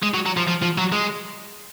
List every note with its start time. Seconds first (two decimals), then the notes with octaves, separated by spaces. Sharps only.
0.03 G#3
0.14 F#3
0.26 F#3
0.37 F3
0.48 F3
0.62 F3
0.78 F#3
0.92 G#3